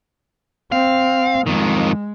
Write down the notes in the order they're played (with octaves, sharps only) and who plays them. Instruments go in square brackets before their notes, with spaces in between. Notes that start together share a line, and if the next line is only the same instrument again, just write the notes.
[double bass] C4 [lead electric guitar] F5
[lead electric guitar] F2 D#3 [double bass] G#3